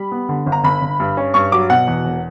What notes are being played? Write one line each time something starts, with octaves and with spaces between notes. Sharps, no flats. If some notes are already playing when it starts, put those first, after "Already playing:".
Already playing: G3 B5
B3
D3
G1
A#5
G1 B5
G1
G2
C#4
G2 C#6
F#3 D6
B2 F#5
E2
E1